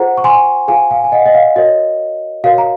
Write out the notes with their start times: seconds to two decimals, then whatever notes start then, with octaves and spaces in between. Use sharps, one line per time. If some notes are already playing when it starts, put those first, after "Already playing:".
Already playing: F4 G#4 C5 F#5 A#5
0.17 C#6
0.24 G#5 C6
0.68 F4 G#4 C5 F5 G#5
0.91 F5 G#5
1.04 G#5
1.12 D#5 F#5
1.26 D#5
1.35 F5
1.56 F#4 A#4 C#5 D#5
2.44 F#4 A#4 C#5 F5
2.58 A#5